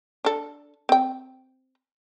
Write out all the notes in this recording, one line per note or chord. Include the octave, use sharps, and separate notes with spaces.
D4 A4
C4 G5